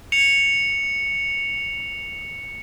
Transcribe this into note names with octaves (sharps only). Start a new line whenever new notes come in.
C#7 F7